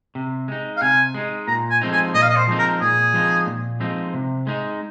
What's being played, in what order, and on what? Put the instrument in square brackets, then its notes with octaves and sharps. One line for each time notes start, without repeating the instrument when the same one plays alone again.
[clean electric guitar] C3
G#3 D#4
[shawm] F5
[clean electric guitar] C3 [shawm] G#5
[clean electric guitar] G#3 D#4
[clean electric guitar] A#2 [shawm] A#5
[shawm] G#5
[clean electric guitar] F3 G#3 C4 D#4
[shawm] G#5
[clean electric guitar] A#2 [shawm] D#5
[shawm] F5
D#5
C5
[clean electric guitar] F3 G#3 C4 D#4
[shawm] A#4
[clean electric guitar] A#2 [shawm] G#4
[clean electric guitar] F3 G#3 C4 D#4
A#2
F3 G#3 C4 D#4
C3
G#3 D#4